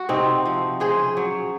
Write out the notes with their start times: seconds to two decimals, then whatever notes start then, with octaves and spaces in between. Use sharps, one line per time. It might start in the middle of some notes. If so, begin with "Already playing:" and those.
Already playing: F#4
0.09 C3 C4 D#4
0.46 F3
0.80 C#3 G#4 C5
1.17 F#3